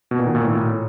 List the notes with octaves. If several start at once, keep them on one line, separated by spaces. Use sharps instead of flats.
B2
A#2
D#3
A#2
A2